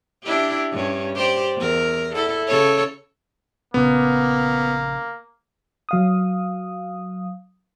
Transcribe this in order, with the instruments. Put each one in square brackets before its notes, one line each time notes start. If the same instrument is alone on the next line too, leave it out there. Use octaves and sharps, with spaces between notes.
[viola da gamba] D4 E4 G4
G2 C#4
G4 C5 D5
E2 A#4
E4 A4
C#3 A4 C#5
[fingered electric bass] A#1 C#3 [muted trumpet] A#3 [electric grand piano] B3
[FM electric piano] F#3 F5 D#6